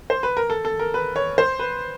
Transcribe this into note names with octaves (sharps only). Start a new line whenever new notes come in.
C5
B4
A#4
A4
A4
A#4
B4
C#5
C5
B4